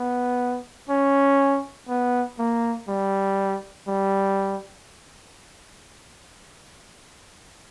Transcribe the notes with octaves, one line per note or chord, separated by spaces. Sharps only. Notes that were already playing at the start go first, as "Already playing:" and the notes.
Already playing: B3
C#4
B3
A#3
G3
G3